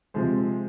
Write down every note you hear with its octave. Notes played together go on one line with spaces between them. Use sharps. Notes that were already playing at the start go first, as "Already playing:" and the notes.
C3 F3 G#3 C4 C5